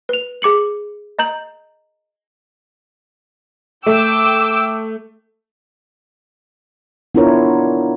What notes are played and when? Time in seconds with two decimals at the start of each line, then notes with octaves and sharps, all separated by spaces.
0.09 B4 F7
0.42 G#4 D6 C#7 F#7
1.19 D#5 A#5 G6 F#7
3.86 A3 G5 D6 E6
7.15 B3 D4 E4 F4 A#4 C#5